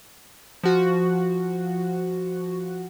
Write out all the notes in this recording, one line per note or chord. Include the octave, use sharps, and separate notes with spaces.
F3 F#4